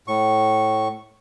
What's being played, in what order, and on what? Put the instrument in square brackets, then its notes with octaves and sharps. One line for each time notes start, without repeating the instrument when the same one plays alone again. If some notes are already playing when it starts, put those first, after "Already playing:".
[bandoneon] A2 C#6